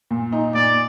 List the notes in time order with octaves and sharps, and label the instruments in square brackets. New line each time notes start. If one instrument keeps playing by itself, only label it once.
[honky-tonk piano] A#2
D#4
[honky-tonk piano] A#2 [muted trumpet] D5